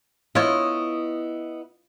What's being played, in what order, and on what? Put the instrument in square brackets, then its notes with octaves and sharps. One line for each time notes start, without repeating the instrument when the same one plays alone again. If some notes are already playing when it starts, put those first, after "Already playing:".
[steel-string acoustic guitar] B3 E4 D#5 [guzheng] F4 C#5